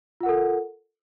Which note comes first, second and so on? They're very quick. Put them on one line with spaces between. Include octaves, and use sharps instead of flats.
F4 F#5 A#4 A4